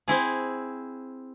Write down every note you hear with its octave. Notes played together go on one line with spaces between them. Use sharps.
C4 E4 G#4